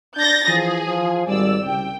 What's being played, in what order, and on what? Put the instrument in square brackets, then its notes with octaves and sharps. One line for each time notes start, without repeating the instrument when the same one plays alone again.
[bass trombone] D4 [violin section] G6 A6 A#6
[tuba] E3 [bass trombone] F3 [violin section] G#4
[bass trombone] F3
[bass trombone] G#1 [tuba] G3 [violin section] D5 E6
[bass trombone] C2 [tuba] C#3 [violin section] G5